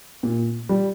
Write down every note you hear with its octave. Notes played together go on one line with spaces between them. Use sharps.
A#2
G3